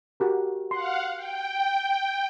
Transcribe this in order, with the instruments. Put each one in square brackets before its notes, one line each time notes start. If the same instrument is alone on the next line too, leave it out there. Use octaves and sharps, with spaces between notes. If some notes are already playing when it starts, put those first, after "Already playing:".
[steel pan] F#4 G4 A#4
[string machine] F5 F#5 [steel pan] C6
[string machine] G5